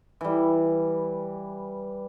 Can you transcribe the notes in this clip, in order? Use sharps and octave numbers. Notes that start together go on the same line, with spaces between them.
E3 G3